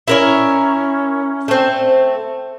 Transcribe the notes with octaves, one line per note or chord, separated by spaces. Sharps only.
C#4 E4 A#4 C#5
A3 C4